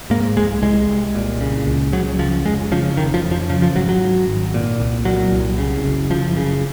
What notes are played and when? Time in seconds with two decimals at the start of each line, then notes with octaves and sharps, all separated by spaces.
0.10 G#2 A#3
0.36 C2 G#3
0.62 C2 G#3
0.89 C2
1.15 A#2
1.41 C#3
1.67 C#2
1.92 C#3 F#3
2.19 C#2 F3
2.45 F1 G#3
2.72 C#3 F3
2.97 F1 D#3
3.14 F3
3.23 F2
3.31 F3
3.49 C#3 F3
3.62 F3
3.75 G#1 F#3
3.89 F#3
4.01 G#1
4.28 G#1
4.54 A#2
4.80 C2
5.05 A#2 F#3
5.32 C2
5.58 C#3
5.84 F#1
6.10 F#1 F3
6.37 C#3